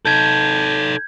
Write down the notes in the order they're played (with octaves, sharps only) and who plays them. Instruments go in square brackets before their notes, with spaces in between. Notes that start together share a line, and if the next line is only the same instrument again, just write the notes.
[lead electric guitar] D#4 A4 [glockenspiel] G6 G#6